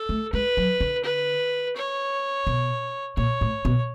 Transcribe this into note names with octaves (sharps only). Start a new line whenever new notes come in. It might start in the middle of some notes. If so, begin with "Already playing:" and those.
Already playing: A4
A3
G#3 B4
F#3
D3
B4
C#5
B2
A#2 C#5
A2
B2